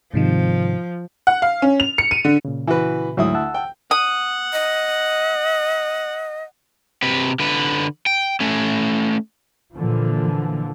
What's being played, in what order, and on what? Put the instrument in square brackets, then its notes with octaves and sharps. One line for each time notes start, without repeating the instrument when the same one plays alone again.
[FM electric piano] G#2 C3 D#3 [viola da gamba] F3
[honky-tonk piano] F#5
F5
C#4
F7
C#7
D#7
D3
[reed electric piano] A#2 C#3
[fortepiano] E3 F#4 B4
[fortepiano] D2 E4 D#6 [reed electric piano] G#2 F#3
[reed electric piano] F#5 A5 E6
[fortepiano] G5
[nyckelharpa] F#5 [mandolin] D#6
[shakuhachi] D#5
[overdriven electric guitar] C3 B4
D3 B4
G5
A3 C#4
[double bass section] A#2 D3 E3 F3